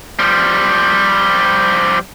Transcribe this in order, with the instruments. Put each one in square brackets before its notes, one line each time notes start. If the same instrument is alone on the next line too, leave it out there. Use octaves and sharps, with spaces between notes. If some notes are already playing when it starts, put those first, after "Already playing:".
[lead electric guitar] F3 G3